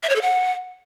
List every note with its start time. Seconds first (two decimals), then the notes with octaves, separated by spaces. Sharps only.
0.03 E5
0.09 C#5
0.16 A4
0.22 F#5